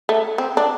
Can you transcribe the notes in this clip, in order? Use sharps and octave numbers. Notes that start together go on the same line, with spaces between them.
A3
C4
D4